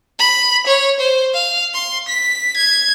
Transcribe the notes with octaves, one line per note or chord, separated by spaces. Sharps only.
B5
C#5
C5
F5
C6
B6
G#6